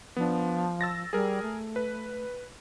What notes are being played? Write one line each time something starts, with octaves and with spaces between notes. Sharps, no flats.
F3 B3 D4
E6 A6 A#6
G3 G#4 A#4
A3
B4